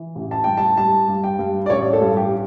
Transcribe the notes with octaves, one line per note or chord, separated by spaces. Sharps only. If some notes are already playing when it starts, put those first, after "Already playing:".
Already playing: E3
A1
A5
G2 G5
A5
G3 A5
G2
G5
G2
D5
A1 C#5
A4
G2
G4